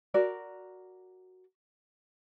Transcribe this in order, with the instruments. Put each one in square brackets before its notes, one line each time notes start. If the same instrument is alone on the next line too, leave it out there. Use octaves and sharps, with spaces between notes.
[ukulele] F#4 A#4 D5